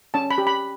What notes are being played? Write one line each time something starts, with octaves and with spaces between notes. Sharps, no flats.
C#4 A5
B5
G4
B5